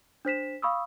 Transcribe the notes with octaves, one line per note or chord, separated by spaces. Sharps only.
D4 C5 B6 E7
F5 B5 C#6 D#6 E6